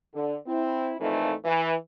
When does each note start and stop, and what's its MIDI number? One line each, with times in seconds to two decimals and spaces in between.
0.14 0.35 50
0.47 0.94 60
0.47 0.94 64
0.99 1.32 41
0.99 1.32 46
0.99 1.32 52
0.99 1.32 57
0.99 1.32 63
1.45 1.74 52